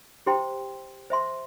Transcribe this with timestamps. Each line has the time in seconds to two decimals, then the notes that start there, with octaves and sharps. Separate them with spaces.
0.26 E4 G4 C5 G5 C6
1.10 C5 E5 C6